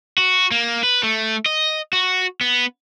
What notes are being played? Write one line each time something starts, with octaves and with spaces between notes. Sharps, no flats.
F#4
A#3
B4
A3
D#5
F#4
B3